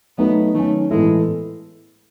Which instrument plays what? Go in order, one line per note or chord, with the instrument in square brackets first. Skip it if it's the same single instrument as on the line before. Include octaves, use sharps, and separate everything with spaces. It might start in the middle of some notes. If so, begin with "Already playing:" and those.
[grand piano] F#3 A3 D#4 F#4 B4 [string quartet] B3
[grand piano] D#3 F#3 C#4 [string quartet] A3
[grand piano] A2 E3 B3 E4 A4 [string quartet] G#3